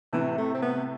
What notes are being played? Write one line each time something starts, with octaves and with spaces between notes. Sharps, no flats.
A2 C3 E3
A3
C4
B3